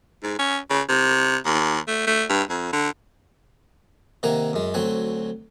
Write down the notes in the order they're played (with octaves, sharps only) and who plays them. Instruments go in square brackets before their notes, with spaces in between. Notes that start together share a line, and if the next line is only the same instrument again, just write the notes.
[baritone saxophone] G#2
C#4
C#3
C3
D#2
A3
A3
G2
F2
D3
[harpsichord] C3 D#3 A#3 F#5 G#5 A#5
F#2 G#3
D2 F#3 C4 F#5 G#5